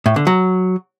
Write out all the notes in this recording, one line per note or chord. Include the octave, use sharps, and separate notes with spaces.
A2
D3
F#3